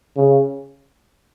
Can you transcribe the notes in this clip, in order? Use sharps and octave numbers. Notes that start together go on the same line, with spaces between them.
C#3